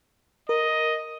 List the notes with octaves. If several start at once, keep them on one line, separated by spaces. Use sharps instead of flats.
A#4 D#5